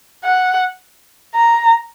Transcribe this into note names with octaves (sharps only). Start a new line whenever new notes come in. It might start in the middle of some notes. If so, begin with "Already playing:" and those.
F#5
A#5